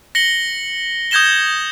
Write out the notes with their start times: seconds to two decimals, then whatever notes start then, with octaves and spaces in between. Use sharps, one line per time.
0.15 A#6 C#7 F#7 G7
1.11 D#6 G6 G#6 A#6 E7 G7